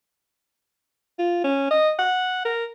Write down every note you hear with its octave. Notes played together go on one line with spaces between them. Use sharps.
F4
C#4
D#5
F#5
A#4